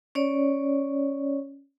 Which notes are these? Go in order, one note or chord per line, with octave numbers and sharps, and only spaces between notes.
C#4 C#5 D5